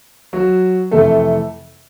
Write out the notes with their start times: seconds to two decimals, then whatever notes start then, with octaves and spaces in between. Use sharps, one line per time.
0.33 F#3 F#4
0.91 F2 C3 E3 A3 A4